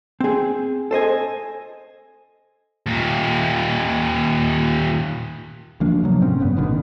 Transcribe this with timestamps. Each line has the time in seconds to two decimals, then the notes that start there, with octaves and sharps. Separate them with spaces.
0.20 C4 G#4
0.91 A4 C5 D#5 G#5
2.86 D#2 A#2
5.80 D2 F3 A#3 D4
6.03 C3 F3 F#3
6.21 F2 A2 C4 C#4
6.39 F#1 G2 A#2 B3
6.57 A1 B2 D3 D#3